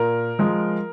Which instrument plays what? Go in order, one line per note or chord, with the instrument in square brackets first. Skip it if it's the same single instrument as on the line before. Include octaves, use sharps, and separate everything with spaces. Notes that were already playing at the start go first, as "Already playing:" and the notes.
Already playing: [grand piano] A#2 A#4
F3 G#3